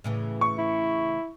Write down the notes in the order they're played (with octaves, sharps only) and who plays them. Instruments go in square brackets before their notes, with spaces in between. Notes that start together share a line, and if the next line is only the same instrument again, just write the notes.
[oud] A2 C#3 E3
[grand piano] C#6
[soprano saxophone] E4